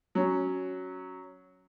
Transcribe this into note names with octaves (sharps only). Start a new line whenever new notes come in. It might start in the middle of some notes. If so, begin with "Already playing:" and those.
F#3 C#4